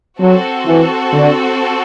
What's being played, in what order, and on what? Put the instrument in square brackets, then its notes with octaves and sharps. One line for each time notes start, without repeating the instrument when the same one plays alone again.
[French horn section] F#3 [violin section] C4 F#4 A4
[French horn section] E3
D3